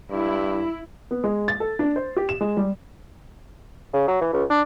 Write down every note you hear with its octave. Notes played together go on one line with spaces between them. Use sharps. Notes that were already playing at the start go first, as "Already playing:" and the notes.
G2 E4
B3
G#3
A6
A4
D4
C5
G4
E7
G#3
G3
C#3
F#3
E3
C#2
D4